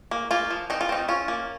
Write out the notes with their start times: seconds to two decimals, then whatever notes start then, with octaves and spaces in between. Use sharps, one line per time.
0.11 A#3
0.31 A#3 F4
0.50 F3
0.70 C4 D#4
0.81 F4
0.89 C4 D#4
1.08 C#4 F4
1.28 A#3